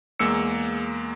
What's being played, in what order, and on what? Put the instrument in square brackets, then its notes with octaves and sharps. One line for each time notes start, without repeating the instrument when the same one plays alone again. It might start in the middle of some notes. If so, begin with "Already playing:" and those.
[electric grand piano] E2 G#3 A#3 E6 C#7